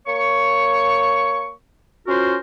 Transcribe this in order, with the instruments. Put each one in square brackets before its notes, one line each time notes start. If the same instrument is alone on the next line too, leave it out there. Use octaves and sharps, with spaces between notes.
[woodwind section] A#3 C#5 C#6
C#4 F4 F#4 A#4 C5